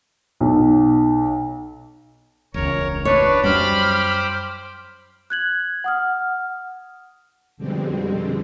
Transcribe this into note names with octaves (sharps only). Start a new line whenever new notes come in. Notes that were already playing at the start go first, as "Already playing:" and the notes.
B1
E1 C#2 A#4 C#5
D4 B4 C#5
F#2 G3 C5 G5 B5 D6 F6
F#6 G#6 F#7
F#5 D#6 F6
F2 B2 D3 G3 G#3 C4